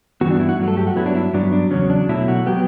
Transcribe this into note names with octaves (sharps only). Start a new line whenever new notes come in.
G2 E3 B3 F#4
D4
E4
F#4
G2 F#3 A3
A4
G4
F#4
G2 F#3 B3 E4
D4
E4
G2 F#3 B3 D4
D4
E2 C#3 F#3 C#4
D4
B2 F#3 A3 E4
F#4
F#3 B3 G4